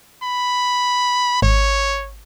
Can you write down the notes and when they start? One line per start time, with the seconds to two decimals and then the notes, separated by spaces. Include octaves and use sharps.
0.22 B5
1.42 G#1 C#5